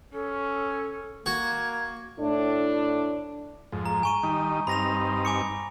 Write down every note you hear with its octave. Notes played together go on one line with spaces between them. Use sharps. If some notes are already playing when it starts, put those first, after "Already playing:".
C#4 A4
A#3 F#4 G#6
A2 D4
F2 G#2
A#5
G#5 C#6 D#7
D#3 G3 D#4
G2 C4 D#4 B5 A#6 F7
G#5 D6 C#7